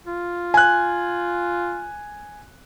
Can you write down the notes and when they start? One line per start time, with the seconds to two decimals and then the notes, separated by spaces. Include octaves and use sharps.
0.07 F4
0.54 G#5 F#6